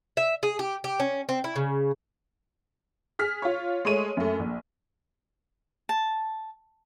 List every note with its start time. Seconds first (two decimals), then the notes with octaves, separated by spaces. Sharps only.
0.17 E5
0.43 G#4
0.59 G4
0.84 G4
1.00 C#4
1.29 C4
1.44 E4
1.56 C#3
3.19 G#4 F6 B6
3.42 F4 C#5
3.85 G#3 A3 C#5 D#7
4.17 F#2 A3
4.39 A#1
5.89 A5